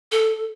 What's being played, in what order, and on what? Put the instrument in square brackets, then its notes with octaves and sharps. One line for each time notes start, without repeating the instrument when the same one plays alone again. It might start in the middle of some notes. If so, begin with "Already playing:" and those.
[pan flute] A4